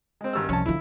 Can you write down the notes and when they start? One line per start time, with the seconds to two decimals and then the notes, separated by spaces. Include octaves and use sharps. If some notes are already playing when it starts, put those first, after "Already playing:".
0.21 G#3 C4
0.33 G#1 G2 E6
0.49 C2 F3 C#4 A5
0.66 D3 F3 E4